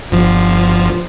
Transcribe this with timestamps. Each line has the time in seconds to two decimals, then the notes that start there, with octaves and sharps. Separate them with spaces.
0.11 G1 F3